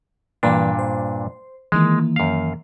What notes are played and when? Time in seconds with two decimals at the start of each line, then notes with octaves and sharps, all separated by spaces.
0.43 G2 A#2 E3 A#3 D4 B4
0.79 C5
1.72 D#3 E3 G#3 A#3
2.16 F#2 F5